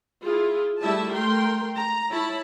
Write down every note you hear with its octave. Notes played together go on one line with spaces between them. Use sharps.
E4 F4 G#4
G3 A3 E4 E5 A5
A3 A#4 G5 C6
A#5
E4 C#5 A5 B5